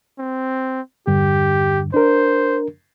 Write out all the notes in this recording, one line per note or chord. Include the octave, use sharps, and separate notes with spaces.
C4
E2 G2 D3 G4
D4 A#4 C5